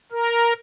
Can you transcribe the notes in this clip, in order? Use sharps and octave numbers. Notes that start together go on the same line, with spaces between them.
A#4